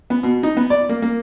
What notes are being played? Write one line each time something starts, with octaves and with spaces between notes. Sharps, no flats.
B3
B2
D#4
B3
D5
A#3
A#3